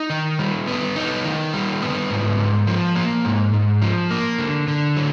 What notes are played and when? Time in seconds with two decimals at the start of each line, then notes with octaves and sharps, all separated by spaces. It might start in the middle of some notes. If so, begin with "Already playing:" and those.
Already playing: D#4
0.10 D#3
0.39 G3
0.67 B3
0.96 D#4
1.25 D#3
1.54 G3
1.82 B3
2.10 G#2
2.39 G#2
2.67 F3
2.95 A#3
3.25 G#2
3.53 G#2
3.82 F3
4.11 A#3
4.39 D3
4.68 D3
4.97 F#3